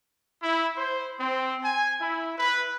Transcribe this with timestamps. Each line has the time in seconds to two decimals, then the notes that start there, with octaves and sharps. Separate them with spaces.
0.43 E4
0.77 C5
1.20 C4
1.62 G#5
2.01 E4
2.37 B4